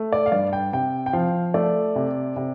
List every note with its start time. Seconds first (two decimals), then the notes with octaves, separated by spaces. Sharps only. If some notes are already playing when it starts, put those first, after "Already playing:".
Already playing: A3
0.12 D5
0.26 F5
0.32 G2 D5
0.53 G5
0.73 C3 G5
1.06 G5
1.13 F3 F5
1.54 A3 D5
1.96 C3
2.36 C3